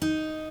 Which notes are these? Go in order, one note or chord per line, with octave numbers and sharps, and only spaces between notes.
D#4